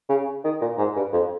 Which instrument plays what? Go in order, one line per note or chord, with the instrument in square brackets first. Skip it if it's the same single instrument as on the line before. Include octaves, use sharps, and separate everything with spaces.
[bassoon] C#3
D#3
A#2
G#2
G2
F2